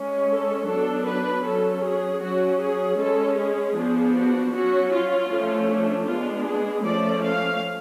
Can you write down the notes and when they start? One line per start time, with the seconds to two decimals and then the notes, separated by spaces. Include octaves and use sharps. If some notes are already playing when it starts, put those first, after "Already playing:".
Already playing: G#3 C#4
0.29 A4
0.67 F#3 B3 D4 A4
1.05 B4
1.43 F#3 C#4 A4
1.82 G#4
2.21 F#3 C#4 F#4
2.59 G#4
2.98 G#3 C#4 A4
3.37 G#4
3.75 F3 B3 D4
4.15 F#4
4.53 F#3 C#4 F#4
4.92 F4
5.30 F3 A3 C#4
5.69 D4
6.07 G#3 B3 D4 F4
6.45 G#4
6.84 F3 A3 C#4 D5
7.22 F5